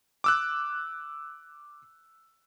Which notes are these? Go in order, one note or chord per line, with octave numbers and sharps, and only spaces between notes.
D6 E6 F#6